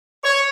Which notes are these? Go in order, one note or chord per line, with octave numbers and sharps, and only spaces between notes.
C#5